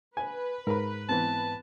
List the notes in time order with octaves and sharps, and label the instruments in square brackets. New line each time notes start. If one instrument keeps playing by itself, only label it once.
[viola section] B4 [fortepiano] G#5
[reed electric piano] G#2 [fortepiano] A#4 B5
[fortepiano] E3 B3 C4 [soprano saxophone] A5